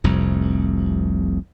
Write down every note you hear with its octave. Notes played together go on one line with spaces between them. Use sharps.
F1 C2 F2